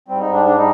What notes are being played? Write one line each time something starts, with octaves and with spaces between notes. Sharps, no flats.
G#2 G3 C4
D#4
D4
D4
G3 D#4